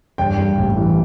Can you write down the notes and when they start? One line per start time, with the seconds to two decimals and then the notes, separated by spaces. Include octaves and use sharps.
0.18 G2 G5
0.37 G3
0.58 A1
0.76 E3